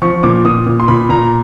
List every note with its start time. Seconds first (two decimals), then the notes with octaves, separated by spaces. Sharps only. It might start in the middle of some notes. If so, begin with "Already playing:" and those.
0.02 F3 C#6
0.23 A#2 D6
0.45 A#2 D#6
0.66 A#2
0.80 C6
0.88 A#2 B5
1.09 A#2 A#5